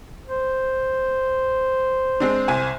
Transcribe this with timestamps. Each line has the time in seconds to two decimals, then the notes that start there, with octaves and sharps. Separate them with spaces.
0.27 C5
2.20 G#3 C4 D4
2.48 C2 G#5